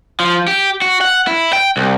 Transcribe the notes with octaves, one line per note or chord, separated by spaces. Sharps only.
F3
G4
F#4
F#5
E4
G5
C2